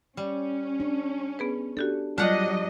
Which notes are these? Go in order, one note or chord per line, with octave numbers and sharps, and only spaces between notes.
G3 C#4
D4
B3 G#4 B4
D4 F#4 G4 A4
F#3 G3 D4 F4 G4 D#5 F#5